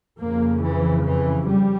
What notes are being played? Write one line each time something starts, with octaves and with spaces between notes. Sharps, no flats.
F2 C#3 A#3
E3
E3
G3